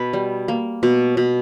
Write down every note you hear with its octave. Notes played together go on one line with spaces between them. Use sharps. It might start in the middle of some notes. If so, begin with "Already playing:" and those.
Already playing: B2 B4
G3
A#3
B2
B2